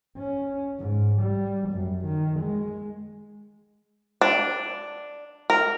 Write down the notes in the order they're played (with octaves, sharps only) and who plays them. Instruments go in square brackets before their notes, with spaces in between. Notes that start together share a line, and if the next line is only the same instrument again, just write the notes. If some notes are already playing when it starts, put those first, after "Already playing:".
[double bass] C#4
G#2
G3
F#2
D#3
G#3
[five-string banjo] D4
A#4